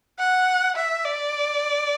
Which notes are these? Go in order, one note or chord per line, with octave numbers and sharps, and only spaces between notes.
F#5
E5
D5